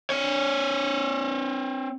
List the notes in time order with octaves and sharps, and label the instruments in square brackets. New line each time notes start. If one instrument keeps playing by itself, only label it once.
[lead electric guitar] C4 C#5